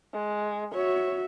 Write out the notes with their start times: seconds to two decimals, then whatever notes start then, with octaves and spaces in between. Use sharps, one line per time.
0.14 G#3
0.74 F#4 C#5 E5